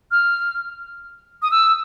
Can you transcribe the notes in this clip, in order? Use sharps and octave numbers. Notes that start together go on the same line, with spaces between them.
F6
D#6
E6